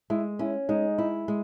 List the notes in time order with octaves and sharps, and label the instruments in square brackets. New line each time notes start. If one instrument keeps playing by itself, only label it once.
[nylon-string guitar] G#3 [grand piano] E4
[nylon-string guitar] C#4 [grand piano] E4
[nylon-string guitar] G#3 [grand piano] D#4
[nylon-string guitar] E4
G#3